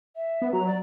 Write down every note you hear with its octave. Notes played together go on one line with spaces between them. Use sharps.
E5
B3
F#3 A#5
D5